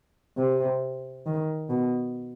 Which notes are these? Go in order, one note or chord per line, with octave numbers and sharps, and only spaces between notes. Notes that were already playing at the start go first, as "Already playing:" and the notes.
C3
D#3
B2